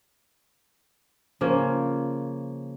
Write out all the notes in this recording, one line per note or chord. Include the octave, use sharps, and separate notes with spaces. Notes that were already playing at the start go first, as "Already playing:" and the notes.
C#3 F3 A#3